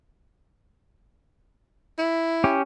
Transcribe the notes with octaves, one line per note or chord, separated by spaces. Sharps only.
E4
C#4 G4